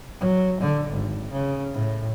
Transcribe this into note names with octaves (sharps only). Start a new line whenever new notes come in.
F#3
D3
G#1
C#3
A2